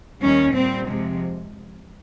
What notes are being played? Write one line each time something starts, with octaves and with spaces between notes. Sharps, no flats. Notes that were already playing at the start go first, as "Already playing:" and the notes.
D#2 D#3 G3 C#4
A#2 G3 C4
F2 C3 F3 G#3